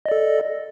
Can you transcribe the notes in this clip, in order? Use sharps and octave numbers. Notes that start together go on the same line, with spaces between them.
A4 D5 D#5